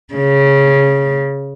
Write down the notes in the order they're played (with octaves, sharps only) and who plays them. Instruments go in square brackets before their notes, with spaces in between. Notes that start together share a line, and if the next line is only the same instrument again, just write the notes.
[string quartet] C#3